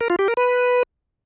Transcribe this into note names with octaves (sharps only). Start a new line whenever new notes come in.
A#4
F4
G4
A#4
B4